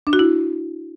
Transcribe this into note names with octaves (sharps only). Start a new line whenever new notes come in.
D4
F#4
E4